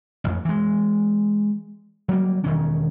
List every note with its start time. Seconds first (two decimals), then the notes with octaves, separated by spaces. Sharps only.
0.24 A1 F2
0.45 E3 G#3
2.08 F#3 G3 A#3
2.44 E1 D#3 C#4